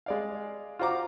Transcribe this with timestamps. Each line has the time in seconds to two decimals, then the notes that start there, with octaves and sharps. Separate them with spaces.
0.06 G#3 D5 F5
0.79 F4 F#4 C5 F#5 A#5 D6